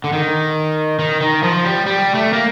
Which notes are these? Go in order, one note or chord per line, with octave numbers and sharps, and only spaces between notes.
D3
D#3
D#3
D#3
F3
G3
G3
A3
A#3